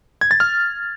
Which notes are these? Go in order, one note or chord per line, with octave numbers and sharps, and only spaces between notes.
G#6
A6
F6